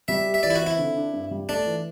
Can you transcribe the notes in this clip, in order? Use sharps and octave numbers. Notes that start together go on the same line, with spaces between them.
G3 E5
G4
E5
E3 D5
E4
F#4
C4 E4
D3
D4
G2
G3
A3 D4
E3